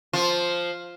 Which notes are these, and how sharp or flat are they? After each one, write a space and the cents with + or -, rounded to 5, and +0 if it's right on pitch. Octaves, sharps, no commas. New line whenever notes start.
F3 +0 F4 +0